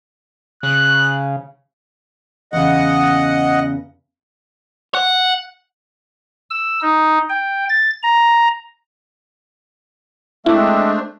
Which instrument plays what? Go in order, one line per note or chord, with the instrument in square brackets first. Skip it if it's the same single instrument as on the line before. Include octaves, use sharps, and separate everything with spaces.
[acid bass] C#3 [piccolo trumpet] F#6
[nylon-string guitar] E2 C#3 [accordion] D#5 F#5
[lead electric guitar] F#5
[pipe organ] E6
D#4
G5
A6
A#5
[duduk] G#3 [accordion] A3 C4 D4 [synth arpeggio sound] E4 [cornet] E5